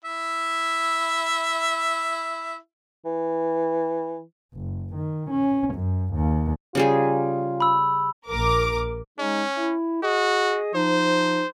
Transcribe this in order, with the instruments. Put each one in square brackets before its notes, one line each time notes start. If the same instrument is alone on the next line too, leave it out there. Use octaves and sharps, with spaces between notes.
[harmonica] E4 E5
[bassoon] E3
[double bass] F#1
D#3
C#4
F#2
D#2
[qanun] C#3 G3 G#4 [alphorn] F4
[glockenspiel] B5 E6
[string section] A#1 A#4 D6
[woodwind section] G#3 D#4 [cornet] C#4
[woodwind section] E4
[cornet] F#4 [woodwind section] G#4 D#5
[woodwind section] F3 D#4 [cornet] C5